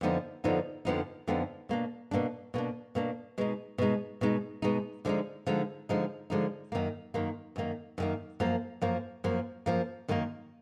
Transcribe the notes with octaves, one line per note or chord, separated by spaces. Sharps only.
F2 D3 F3 B3 D#4
F2 D3 F3 B3 D#4
F2 D3 F3 B3 D#4
F2 D3 F3 B3 D#4
B2 A#3 D4
B2 A#3 D4
B2 A#3 D4
B2 A#3 D4
B2 G#3 D#4
B2 G#3 D#4
B2 G#3 D#4
B2 G#3 D#4
D3 F3 G#3 D#4
D3 F3 G#3 D#4
D3 F3 G#3 D#4
D3 F3 G#3 D#4
F#2 D#3 A#3
F#2 D#3 A#3
F#2 D#3 A#3
F#2 D#3 A#3
F#2 F3 A#3
F#2 F3 A#3
F#2 F3 A#3
F#2 F3 A#3
F#2 D#3 A#3